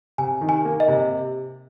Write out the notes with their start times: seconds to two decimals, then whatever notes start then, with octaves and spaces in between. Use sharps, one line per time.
0.18 C3 G#5
0.41 D#3
0.49 G#5
0.65 A#3
0.80 D#5
0.88 C3